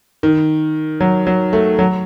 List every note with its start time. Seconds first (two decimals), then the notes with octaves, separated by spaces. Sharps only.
0.23 D#3
1.00 F#3
1.27 F#3
1.53 A3
1.79 F#3